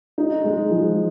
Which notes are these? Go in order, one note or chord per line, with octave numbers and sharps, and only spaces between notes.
D#4
G#3
F3